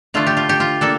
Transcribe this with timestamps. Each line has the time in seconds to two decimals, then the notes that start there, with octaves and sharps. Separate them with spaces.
0.14 D3 A3 D4 F4
0.27 G4
0.37 F4
0.49 G4
0.60 F4
0.81 A#3 D4 A4